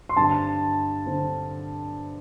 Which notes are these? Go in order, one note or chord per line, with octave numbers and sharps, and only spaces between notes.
C6
G2 D3 C4 A5
D3 C4